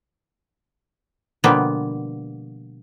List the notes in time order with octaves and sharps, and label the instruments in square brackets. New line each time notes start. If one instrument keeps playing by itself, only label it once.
[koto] B2 D3 F3 G3 A#3 B3